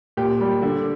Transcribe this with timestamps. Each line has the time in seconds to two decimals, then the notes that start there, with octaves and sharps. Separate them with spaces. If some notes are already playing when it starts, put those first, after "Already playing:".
0.17 A#2 G4
0.41 G3
0.62 D3